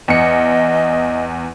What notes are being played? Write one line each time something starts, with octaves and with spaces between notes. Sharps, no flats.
E2 D#5 C#7